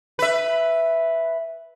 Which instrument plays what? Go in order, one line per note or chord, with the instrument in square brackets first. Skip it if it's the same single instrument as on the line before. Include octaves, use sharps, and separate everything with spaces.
[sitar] B4 E5